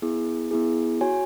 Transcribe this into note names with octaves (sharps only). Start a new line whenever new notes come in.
B3 E4 G#4
B3 E4 G#4
F#4 C#5 G#5